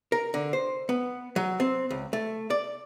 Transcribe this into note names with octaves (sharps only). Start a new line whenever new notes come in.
A#4
D3
C5
B3
F#3
C4
C#2
A3
D5